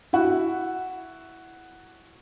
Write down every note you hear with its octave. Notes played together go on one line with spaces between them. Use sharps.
E4 F#4